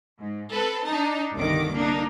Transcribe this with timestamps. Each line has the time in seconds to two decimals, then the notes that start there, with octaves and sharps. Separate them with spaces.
0.19 G#2
0.53 C4 A4 B4
0.86 D4 D#4 A5
1.34 G1 C2 G2 D#3 D6
1.74 A#3 D4 D#4